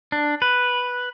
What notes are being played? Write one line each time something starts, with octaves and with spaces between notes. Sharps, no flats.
D4
B4